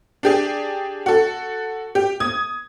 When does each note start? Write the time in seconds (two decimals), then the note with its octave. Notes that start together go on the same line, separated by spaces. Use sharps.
0.23 D4 G4 G#4
1.06 F#4 A4
1.95 G4
2.20 D#6 G#6